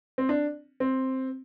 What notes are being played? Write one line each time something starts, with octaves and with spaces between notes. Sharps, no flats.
C4
D4
C4